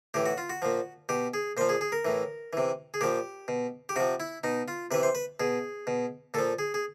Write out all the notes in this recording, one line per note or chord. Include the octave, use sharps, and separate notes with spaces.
A2 E3 G4
F#4
F4
F#4
A#2 F3
B2 G4
G#4
A#2 F3 C5
G#4
G#4
A#4
A2 E3
C3 E3
G#4
A#2 F3 G4
B2
G4
C3 F3 F#4
E4
B2 D#4
F4
C3 E3 B4
C5
B4
B2 G#4
B2
A#2 F3 A4
G#4
G#4